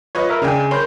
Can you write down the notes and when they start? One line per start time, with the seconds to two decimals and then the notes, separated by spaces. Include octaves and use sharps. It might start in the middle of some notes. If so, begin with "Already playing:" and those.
0.15 F4 B4 C#5 D#5
0.29 A#4 E5
0.42 C#2 C#3 D4 G5 G#5
0.71 A#4 C#5 B5 C6 G6